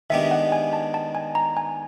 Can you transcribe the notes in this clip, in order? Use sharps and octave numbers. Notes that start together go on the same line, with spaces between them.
D#3 G#3 B3 D4 G4 E5
F#5
G#5
A5
A5
G#5
A#5
G#5